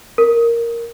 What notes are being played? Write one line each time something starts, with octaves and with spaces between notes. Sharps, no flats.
A#4